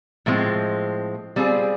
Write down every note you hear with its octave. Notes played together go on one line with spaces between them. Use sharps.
A2 F3 G#3 C4
G3 C4 F4 G#4